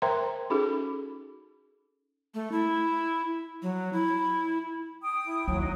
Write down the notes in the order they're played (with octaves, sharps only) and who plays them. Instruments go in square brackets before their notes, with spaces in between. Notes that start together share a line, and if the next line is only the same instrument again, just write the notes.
[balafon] A#4 C5 E5 G5 A#5 C6
C#4 D#4 F#4 G#4 A4
[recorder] A3
E4
F#3
E4
[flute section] G5 D#6
[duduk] E4
[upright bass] D#2 [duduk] F#3
[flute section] D#4